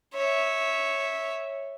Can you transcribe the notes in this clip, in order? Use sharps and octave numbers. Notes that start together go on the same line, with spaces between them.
C#5 E5